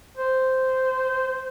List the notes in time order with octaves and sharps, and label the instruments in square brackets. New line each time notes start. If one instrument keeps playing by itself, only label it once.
[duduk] C5